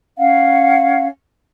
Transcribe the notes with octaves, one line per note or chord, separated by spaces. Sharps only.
C#4 F5 F#5